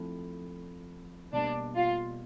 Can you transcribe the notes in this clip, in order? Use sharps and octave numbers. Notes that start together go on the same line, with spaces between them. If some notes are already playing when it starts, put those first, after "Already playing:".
Already playing: F3 A3 C4 E4
B2 G3 A#3 D4
F4